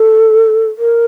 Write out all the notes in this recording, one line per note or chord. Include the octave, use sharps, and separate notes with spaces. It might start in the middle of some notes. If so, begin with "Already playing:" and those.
Already playing: A4
A#4